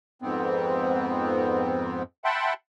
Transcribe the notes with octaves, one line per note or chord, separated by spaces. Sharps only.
F2 G#2 B3 C4
E5 F#5 G5 A5 B5 C6